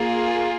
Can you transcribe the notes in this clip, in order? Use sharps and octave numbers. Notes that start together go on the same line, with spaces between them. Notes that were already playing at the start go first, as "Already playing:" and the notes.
Already playing: A#3 F4 G#4